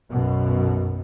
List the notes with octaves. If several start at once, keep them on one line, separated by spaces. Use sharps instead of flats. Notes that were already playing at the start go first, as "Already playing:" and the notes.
B1 F#2 B2